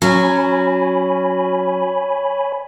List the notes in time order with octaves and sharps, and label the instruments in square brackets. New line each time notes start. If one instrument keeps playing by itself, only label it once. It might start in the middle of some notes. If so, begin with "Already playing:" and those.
[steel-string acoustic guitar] F#3 C#4 [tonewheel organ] C#5 G#5 B5